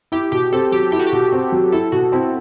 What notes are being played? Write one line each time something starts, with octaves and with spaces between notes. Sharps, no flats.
E4 G4
B2 G4
C4 A4
F#3 G4
E4 G4
F#4
G4
B2
C4
F#3
E4 A4
B2 F#4
C4 E4